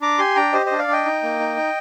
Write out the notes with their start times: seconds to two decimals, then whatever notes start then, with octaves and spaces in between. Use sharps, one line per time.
0.01 D4 A#5 D6
0.18 G4 G#5 C6
0.36 D4 G5 A#5
0.53 G4 C5 D#5
0.66 C5 D#5
0.71 D4
0.79 D5 F5
0.88 D4 D#5 G5
1.05 D#4
1.23 A#3
1.39 D#4
1.56 D#4